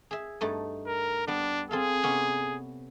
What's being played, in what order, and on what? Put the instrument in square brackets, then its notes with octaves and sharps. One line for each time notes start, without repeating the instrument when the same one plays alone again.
[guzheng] G#4 E5
G2 A3 D#4
[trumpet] A#4
[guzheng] G3 B3 [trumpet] D4
[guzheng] C4 A4 F5 [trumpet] G#4
[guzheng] C3 B3 C#4